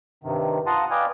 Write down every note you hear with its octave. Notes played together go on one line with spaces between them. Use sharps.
G2 C3 D#3
F4 F#5 A5 A#5 C6 D#6
B4 D5 D#5 F5 G5 G#5